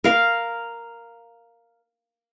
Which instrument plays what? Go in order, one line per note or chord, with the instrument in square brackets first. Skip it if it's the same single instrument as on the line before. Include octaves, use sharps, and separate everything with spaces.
[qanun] A#4 F5